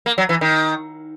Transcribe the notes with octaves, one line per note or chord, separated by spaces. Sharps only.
A#3
F#3
E3
D#3